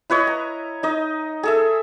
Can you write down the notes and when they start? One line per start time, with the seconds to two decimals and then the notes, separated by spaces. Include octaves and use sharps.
0.10 E4 B4 C#5 D#5
0.27 A#5
0.83 D#4 D#5
1.43 G#4 A4 E5